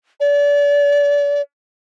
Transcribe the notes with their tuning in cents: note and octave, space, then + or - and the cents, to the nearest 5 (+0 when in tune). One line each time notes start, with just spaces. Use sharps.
D5 -35